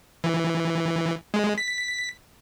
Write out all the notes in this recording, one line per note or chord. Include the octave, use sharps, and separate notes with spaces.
E3
G#3
B6